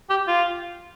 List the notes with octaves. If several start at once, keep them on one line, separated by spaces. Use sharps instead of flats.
G4
F4